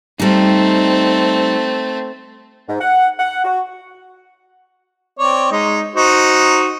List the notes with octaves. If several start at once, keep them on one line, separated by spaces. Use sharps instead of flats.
G3 A3 C4 D#4
G#2
F#5
F#5
F#4
C4 C#5 D5
G#3 D#4 D#5
D#4 F#4 C5